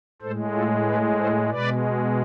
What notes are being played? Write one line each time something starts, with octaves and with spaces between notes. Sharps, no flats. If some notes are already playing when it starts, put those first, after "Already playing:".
A2 G#3 A4 C5
F4 A4
G#4 B4
A4 C5
B2 G#3 B4 D5